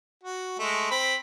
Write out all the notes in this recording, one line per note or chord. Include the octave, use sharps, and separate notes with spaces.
F#4
G#3 A3
C4 B5